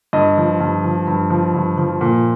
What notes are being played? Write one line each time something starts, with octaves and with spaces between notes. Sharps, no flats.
G2 D#5
F3
G2
F3
G2
F3
G2
F3
A#2